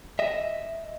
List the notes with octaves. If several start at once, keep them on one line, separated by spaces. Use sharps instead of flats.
D#5 E5